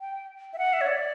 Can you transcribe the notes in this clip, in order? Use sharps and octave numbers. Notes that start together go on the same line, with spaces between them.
G5
E5
F#5
E5
C#5
D5